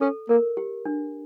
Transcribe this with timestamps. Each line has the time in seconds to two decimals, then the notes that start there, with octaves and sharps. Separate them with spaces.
0.01 C#4 A4
0.29 A#3 A#4
0.57 G4
0.86 D4